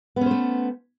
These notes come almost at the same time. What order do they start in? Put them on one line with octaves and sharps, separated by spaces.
B3 C#4 C5 A3